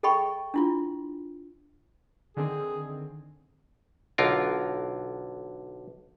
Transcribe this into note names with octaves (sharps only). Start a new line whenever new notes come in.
G#4 A4 D#5 G5 B5 C#6
D4 E4 F4
D3 D#3 C4 G#4
B1 D3 F4 A#4